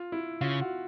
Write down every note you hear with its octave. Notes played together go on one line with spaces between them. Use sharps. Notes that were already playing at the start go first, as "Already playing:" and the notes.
Already playing: F4
E4
C#3 F4
F#4